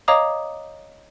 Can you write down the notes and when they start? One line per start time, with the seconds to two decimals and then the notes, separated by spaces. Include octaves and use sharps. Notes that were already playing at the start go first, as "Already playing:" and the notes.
0.08 C#5 D#5 F5 A#5 D6 D#6